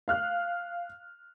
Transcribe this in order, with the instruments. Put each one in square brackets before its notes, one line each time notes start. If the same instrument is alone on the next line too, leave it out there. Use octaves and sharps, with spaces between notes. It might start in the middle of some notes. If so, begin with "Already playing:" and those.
[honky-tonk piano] F5 F6 F#6